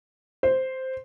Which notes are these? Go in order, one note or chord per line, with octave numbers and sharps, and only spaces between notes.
C5